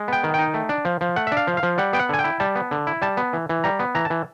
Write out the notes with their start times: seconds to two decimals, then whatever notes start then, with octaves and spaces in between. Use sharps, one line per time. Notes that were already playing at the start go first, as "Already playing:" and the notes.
Already playing: G#3
0.08 B3 G5
0.24 D#3
0.34 D#4 G5
0.54 A3
0.69 D4
0.85 F3
1.01 F3
1.16 A3 F#5
1.27 E5
1.32 D4
1.37 F5
1.47 F3
1.57 F5
1.63 F3
1.78 G3 F#5
1.93 B3 G5
1.99 F#5
2.09 D3 G#5
2.19 G5
2.24 E4
2.40 G3 A5
2.56 B3
2.71 D3
2.87 E4
3.02 G3 A5
3.17 B3
3.33 E3
3.49 E3
3.64 G3 A#5
3.79 B3
3.95 E3 A#5
4.05 A5
4.10 E3